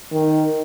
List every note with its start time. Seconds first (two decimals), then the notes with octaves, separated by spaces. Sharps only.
0.12 D#3